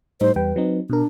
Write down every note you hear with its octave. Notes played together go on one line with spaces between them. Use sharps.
A2 G3 D#4 C5
E2 G3 B4 G5
F#3 C4 D#4
B2 D4 A#4